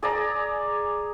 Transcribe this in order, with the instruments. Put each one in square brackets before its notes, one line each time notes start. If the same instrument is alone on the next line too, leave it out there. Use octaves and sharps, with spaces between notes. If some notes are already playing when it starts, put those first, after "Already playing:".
[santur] G#4 D5 A#5